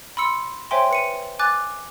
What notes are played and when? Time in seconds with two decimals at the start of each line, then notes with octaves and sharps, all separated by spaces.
0.17 B5 C6 E6 C#7
0.71 C5 C#5 E5 G5 G#5 C6
0.91 B4 C#7 D#7
1.39 G#5 D6 F#6 A6